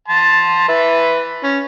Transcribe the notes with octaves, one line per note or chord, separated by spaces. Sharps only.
A5 C6
B4 E5
C#4